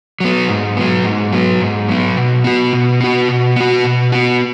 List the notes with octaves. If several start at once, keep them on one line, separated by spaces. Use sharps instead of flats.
F#3 B3
G#2
F#3 B3
G#2
F#3 B3
G#2
F#3 B3
B2
B3 F#4
B2
B3 F#4
B2
B3 F#4
B2
B3 F#4